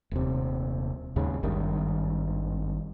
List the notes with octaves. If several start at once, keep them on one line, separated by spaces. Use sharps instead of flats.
D#1 C3
D#2 G#2 C#3
G#1 G2 D#3